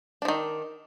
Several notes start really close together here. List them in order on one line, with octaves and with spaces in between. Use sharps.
D4 F3 D#3